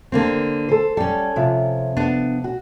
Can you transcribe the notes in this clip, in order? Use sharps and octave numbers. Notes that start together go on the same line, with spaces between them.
D3 A#3 C4
A4 C5
G3 C#4 A4
C3 F3
B3 D4
F#4